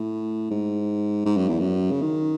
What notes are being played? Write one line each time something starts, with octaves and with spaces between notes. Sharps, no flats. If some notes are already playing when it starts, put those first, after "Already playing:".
Already playing: A2
G#2
G#2
F#2
E2
F#2
C#3
D#3